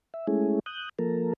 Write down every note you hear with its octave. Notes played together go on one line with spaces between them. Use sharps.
E5
G#3 A3 C#4 E4 G#4
D#6 F#6 G6
F3 A#3 A4 A#4